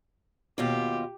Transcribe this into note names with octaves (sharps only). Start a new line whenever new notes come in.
D#2 B2 F4 G4